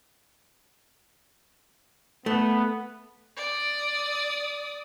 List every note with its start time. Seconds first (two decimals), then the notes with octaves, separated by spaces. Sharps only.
2.26 A3 B3
3.37 D5 D#6